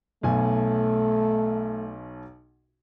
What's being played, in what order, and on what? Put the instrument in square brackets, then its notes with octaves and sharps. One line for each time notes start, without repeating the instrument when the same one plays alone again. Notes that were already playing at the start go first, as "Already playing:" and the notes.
[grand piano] B1 B2 G#5 [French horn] A3